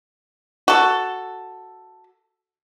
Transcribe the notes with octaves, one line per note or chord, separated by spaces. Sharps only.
F#4 A4